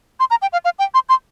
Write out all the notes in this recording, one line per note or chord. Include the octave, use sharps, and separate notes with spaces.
C6
A#5
G5
F5
F5
G5
C6
C6